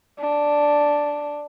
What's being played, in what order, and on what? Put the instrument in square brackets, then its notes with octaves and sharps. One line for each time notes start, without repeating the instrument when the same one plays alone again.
[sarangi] D4